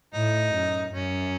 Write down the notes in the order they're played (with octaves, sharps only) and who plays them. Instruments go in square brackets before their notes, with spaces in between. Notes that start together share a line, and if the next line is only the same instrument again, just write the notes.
[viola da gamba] A2 [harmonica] D#4
[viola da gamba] F#2
[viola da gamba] F#2 [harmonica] C#4